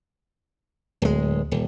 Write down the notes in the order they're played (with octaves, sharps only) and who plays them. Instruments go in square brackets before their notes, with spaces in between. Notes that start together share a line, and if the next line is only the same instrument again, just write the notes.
[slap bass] D1 G#3 [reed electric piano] D2
[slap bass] D#1